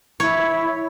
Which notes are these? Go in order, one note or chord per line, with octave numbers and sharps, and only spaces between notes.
E4 C#5